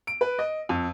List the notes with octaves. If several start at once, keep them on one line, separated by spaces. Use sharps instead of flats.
D7
B4
D#5
F2